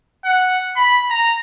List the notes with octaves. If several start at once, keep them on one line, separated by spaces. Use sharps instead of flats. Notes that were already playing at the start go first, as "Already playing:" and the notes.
F#5
B5
A#5